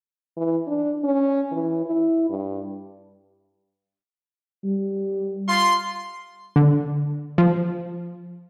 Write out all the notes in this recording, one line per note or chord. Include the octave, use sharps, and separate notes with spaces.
E3
D4
C#4
E3
E4
G2
G3
F4 C6
D3
F3